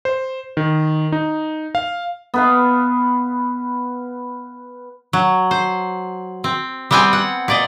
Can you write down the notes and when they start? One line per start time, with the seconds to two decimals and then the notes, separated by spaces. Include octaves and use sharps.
0.05 C5
0.57 D#3
1.12 D#4
1.75 F5
2.34 B3 B4 F5
5.13 F#3
5.51 C5
6.44 C4
6.91 G3 B3 C4 G5 G#5
7.13 F#5
7.48 A#2 D5 D#5